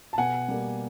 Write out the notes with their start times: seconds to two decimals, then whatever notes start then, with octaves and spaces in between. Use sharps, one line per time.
0.13 A5
0.18 B2 F#5 G#5
0.48 G3 A#3